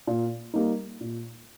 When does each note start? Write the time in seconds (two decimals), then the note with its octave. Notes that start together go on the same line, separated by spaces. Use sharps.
0.07 A#2
0.54 G3 A#3 D#4
1.01 A#2